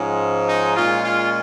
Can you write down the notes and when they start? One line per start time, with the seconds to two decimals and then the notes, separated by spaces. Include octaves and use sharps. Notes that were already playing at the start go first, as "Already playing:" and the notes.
Already playing: G#2 F3 G#3 C#4
0.47 D#4
0.76 A#2 G#3 C#4 F4
1.05 F4